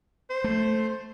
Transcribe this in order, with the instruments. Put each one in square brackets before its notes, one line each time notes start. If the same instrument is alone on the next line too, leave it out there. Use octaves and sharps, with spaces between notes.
[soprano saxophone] C5
[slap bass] A3